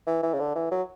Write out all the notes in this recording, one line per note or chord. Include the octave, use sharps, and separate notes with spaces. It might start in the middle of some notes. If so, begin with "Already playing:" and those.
E3
E3
C#3
D3
E3
F#3